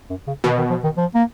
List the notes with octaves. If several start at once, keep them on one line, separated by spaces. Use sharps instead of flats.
F#2
C#3
B2 D#3
D#3
F3
D#3
F3
A#3